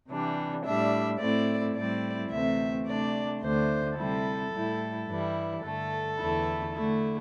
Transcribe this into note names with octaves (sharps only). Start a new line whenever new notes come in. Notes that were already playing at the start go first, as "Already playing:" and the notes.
C3 E3 G3 D4
A2 G3 D4 E5
A2 A3 C4 E4 D5
A2 G3 C4 E4 D5
D2 C3 E3 A3 C4 E5
C3 A3 D4 D5
D2 D3 A3 D4 C5
C3 G3 E4 A4
A2 G3 E4
G2 E3 G3 E4
G2 D3 A3 A4
E2 D3 A3 E4
D3 A3 E4